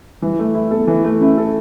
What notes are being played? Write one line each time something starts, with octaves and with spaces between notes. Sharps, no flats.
E3 G3
A3
E4
B3 A4
E3
A3
C#4 E4
A4